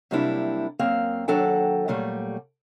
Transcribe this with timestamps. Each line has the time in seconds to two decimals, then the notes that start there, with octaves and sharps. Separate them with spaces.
0.11 C3 F#3 G3 A#3 D4 E4
0.79 F#2 A#3 C4 F5
1.28 D#2 F#3 D4 A4 F#5 G5
1.88 A#2 F#3 G3 A3